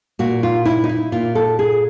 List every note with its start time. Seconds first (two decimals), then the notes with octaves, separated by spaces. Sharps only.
0.19 A#2 F#4
0.43 F4
0.65 E4
0.84 D#4
0.89 E4
1.12 A#2 F4
1.35 A4
1.59 G#4